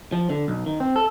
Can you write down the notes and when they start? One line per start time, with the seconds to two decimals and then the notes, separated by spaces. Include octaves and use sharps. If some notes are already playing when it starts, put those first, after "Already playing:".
0.12 F3
0.30 D3
0.48 B1
0.66 D#3
0.80 C4
0.96 A4